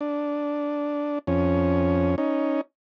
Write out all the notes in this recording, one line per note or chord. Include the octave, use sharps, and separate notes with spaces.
D4
F2 C#4
C#4 D#4